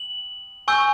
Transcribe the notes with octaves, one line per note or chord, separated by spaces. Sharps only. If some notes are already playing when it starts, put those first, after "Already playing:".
Already playing: F#7
G#5 C#6 E6 G6